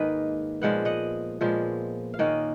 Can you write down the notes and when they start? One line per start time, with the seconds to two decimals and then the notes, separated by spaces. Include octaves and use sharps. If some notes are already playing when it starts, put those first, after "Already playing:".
Already playing: G#2 D#3 A#3 G#4 B4 D#5
0.62 A#2 F3 G#3 B3 F#5
0.85 D#5 F#5
1.41 A#2 F3 G#3 B3
2.14 F5
2.19 D#3 A#3 C#4 D#5 F#5